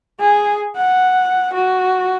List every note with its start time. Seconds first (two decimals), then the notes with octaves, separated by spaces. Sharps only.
0.20 G#4
0.76 F#5
1.53 F#4